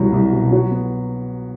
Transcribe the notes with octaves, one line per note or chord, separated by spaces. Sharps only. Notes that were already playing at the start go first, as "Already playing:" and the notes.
Already playing: C2 F#3
C2
B2
F#3
B3